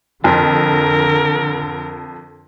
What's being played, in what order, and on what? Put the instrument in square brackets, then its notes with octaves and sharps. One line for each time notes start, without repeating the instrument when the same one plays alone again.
[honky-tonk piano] F2 [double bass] D3 [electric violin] A#4